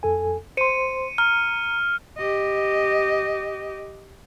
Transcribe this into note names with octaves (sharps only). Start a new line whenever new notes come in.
F2 A4 G#5
C5 C6 C#7 D#7
A#5 F6
G4 D#5